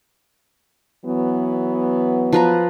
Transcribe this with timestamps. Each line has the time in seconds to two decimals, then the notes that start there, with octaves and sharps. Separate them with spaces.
1.05 E3 F#3 B3
2.33 F3 B4 A#5